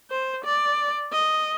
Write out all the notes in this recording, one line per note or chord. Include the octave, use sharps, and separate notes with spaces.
C5
D5
D#5